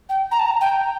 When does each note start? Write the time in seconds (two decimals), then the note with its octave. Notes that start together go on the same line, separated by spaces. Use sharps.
0.09 G5
0.32 A#5
0.39 A5
0.46 A#5
0.61 G5